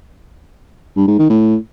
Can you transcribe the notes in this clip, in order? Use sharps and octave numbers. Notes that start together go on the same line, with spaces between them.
G2
G#2
D#3
A2